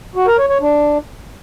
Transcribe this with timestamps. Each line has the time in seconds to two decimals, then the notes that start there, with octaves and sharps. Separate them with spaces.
0.16 F#4
0.27 A#4
0.38 C#5
0.50 C#5
0.61 D4